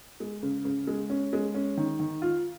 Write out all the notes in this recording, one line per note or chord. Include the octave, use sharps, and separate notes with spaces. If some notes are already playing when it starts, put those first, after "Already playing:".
G#3
C#3
C#3
G#3
C#4
G#3
C#4
D#3
D#3
F4